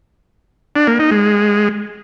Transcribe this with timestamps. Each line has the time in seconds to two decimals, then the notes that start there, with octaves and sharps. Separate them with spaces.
0.76 D4
0.87 A#3
0.99 D#4
1.11 G#3